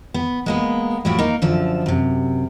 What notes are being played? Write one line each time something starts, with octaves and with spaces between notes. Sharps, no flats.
B3
G#3 A#3 B3
A2 F3 E4 F#4 G4
A#3 D#4 A#4
F#2 D3 F3 A4
F#2 C3